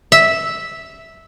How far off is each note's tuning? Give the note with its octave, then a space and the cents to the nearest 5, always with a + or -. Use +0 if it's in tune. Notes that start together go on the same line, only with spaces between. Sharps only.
E5 -10